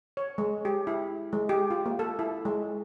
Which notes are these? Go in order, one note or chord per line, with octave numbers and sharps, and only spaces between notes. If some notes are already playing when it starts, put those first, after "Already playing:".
C#5
G#3
G4
E4
G#3
G4
F4
A#3
A4
E4
G#3